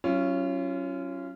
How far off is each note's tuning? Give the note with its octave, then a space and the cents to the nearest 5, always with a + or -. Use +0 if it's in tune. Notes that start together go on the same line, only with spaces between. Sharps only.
F#3 +20 C#4 +0 F4 -35